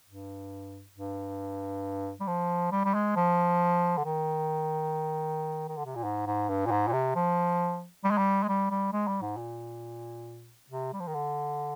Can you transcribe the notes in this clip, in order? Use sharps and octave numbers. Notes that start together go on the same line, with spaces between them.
G2
G2
G3
F3
G3
G3
G#3
F3
D3
D#3
D#3
D3
C3
A#2
G#2
G#2
G2
A#2
G#2
A#2
C3
F3
G3
G#3
G3
G#3
G3
G3
G#3
G3
G#2
A#2
C3
G3
F3
D#3
D3